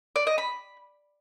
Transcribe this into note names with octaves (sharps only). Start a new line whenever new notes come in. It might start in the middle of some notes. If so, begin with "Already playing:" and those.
D5
D#5
B5